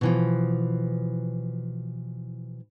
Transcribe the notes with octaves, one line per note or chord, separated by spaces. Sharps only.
B2 E3 F3